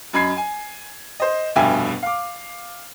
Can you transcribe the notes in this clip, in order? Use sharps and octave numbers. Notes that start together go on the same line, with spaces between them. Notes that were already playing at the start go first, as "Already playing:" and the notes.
F#2 D#5 B5 G#6 C7
G#5
C5 D#5
F1 G2 B2 E5 G5 G#5
F5 D6